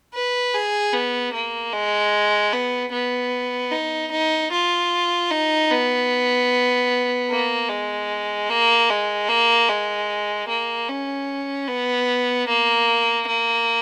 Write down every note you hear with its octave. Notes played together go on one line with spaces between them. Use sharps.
B4
G#4
B3
A#3
G#3
B3
B3
D#4
D#4
F4
D#4
B3
A#3
G#3
A#3
G#3
A#3
G#3
A#3
C#4
B3
A#3
A#3